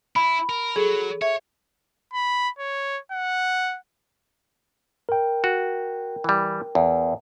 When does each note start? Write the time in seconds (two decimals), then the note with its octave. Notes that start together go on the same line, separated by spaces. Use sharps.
0.16 E4 B5
0.49 A#4
0.76 F#3 G#4 A4
1.22 C#5 E5
2.13 B5
2.59 C#5
3.12 F#5
5.09 A#4 G5
5.44 F#4
6.24 E3 G3
6.75 E2